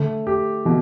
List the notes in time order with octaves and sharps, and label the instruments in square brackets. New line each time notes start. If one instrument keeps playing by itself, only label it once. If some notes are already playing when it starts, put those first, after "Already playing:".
Already playing: [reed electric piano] D3 [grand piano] A3
[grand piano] G4
[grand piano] B2 [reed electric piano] E3